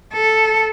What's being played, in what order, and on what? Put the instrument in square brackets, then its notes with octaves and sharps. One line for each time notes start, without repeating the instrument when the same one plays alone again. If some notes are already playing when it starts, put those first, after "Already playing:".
[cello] A4